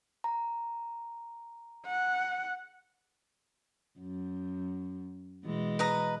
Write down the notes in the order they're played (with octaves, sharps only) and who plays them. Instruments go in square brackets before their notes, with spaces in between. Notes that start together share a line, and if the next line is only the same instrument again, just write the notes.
[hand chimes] A#5
[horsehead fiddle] F#5
[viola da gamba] F#2
B2 E3 G#3
[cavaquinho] B4 D#5 A#5